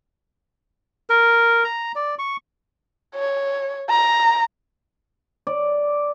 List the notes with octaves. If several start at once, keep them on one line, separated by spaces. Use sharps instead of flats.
A#4
A#5
D5
C#6
C#5
A#5
D5